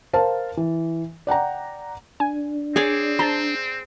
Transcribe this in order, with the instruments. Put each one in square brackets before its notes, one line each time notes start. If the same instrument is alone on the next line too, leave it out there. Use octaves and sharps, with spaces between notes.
[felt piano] A#4 C5 F5 A5
E3
D5 F#5 G5 A#5
[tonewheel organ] D4 [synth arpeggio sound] G#5
[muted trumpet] C4 [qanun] G#4 C#5 D5
[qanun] C5 [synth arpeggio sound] A5 A#5